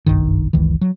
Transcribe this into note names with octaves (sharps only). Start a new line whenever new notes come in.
F#1 B1 G2 D#3
F#1 C#2 D#3 E3
F#3